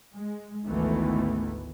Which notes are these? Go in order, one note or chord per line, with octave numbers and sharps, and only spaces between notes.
G#3
G#1 D2 D#3 E3 A3 B3